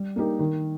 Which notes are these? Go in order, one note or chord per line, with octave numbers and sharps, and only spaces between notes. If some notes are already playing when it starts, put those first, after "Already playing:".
Already playing: G3
A#3 D#4 G4 A#4
D#3